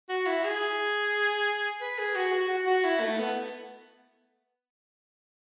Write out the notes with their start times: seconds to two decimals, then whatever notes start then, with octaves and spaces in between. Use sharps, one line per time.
0.09 F#4
0.26 E4
0.44 G#4
1.81 B4
1.98 G#4
2.15 F#4
2.33 F#4
2.49 F#4
2.67 F#4
2.84 E4
3.01 A3
3.19 B3